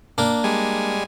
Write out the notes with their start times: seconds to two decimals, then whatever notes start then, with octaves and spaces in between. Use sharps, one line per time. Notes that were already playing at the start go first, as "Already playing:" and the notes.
0.18 A#3 D4 A#4
0.44 G3 G#3 G#5